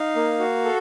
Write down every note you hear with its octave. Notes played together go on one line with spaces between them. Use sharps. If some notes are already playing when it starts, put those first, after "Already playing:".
Already playing: D#4 F5
A#3
F#4
A4